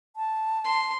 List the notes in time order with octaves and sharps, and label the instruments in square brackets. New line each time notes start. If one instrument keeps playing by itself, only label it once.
[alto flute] A5
[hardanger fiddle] C6